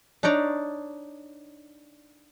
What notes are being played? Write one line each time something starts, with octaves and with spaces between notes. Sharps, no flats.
D4 D#4 C#5 D5 A#5